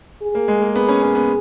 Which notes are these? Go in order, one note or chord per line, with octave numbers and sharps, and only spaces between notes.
G#4
A#3
G#3
A#3
B3 G#4
C#4
C#4
B3